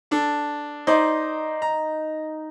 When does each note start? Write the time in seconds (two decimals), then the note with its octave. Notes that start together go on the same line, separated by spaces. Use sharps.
0.11 D4 A4
0.87 D#4 C5 D5
1.62 A#5